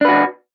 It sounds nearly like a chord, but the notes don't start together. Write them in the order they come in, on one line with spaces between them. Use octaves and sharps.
D4 B4 F#4